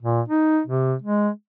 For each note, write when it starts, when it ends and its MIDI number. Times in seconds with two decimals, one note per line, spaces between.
0.02 0.22 46
0.28 0.61 63
0.67 0.95 48
1.02 1.30 56